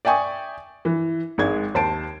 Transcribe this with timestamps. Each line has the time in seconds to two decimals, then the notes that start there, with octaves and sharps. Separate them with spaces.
0.05 D5 E5 G5 G#5 C#6 D#6
0.85 E3
1.38 G#1 G#3 G#6
1.74 D#2 C5 A5 D7